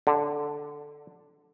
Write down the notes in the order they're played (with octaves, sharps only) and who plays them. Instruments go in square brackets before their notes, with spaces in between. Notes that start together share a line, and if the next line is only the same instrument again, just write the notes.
[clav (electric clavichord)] D3